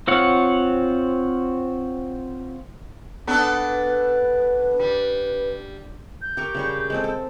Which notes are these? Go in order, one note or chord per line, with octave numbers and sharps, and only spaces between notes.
C4 F4 C#5 F#5
B3 D4 A4
B4
G3
G6
G4 A#4 C#6
C#3 G3 C#6
G#3 C4 A4
A4